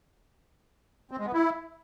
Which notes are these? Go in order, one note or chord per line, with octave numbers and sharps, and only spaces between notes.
C4
G#3
B3
E4